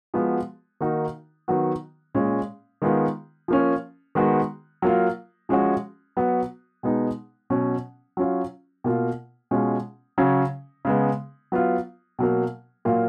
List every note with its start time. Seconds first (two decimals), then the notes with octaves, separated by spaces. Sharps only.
0.14 F3 G#3 B3 F#4
0.81 D#3 A#3 D#4 F#4
1.48 D#3 F#3 B3 F#4
2.14 A#2 G#3 C#4
2.82 D#3 G#3 B3 F4
3.48 F3 A#3 C#4
4.15 D#3 G#3 B3 F#4
4.82 F#3 A#3 F4
5.49 F3 G#3 C#4 F#4
6.17 F#3 B3 F#4
6.83 B2 G#3 B3 D#4
7.50 B2 F#3 C#4
8.17 F#3 C#4 F4
8.84 B2 A#3 F4
9.51 B2 G#3 C#4 F4
10.18 C#3 F#3 C#4
10.85 C#3 G#3 B3
11.52 F#3 B3 F4
12.19 B2 F#3 A#3
12.85 A#2 F#3 A#3 F4